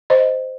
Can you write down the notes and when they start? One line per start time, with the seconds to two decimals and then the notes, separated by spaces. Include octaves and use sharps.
0.10 C5 D#5